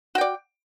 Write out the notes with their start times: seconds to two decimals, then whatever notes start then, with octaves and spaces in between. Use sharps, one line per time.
0.15 F#4
0.18 G5
0.21 D5